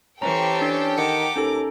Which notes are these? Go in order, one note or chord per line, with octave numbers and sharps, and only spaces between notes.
E3 C#4 G4 A4 C5 G5 A#5 C#6
D4 A6
D#3 F#5 A#5 D6 C#7
D#2 C#4 D#4 A4